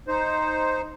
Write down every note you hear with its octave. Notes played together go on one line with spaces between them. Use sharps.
D#4 C5